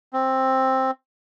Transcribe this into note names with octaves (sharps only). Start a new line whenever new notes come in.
C4